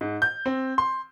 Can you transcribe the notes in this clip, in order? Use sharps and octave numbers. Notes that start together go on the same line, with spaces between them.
G#2
G6
C4
C6